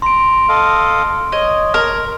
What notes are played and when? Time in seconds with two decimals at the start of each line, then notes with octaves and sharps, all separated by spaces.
0.02 A#5 C6 D7
0.49 A4 D#5 F5
1.32 C#5 D#5
1.74 A#4